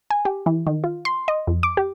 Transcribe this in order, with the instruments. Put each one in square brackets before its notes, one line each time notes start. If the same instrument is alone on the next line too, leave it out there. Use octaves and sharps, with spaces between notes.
[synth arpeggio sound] G#5
G4
E3
D#3
F4
C6
D#5
F2
D6
G4